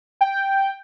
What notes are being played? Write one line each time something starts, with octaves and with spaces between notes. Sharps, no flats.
G5